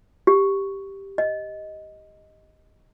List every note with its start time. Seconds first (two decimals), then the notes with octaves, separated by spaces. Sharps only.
0.27 G4
1.18 D#5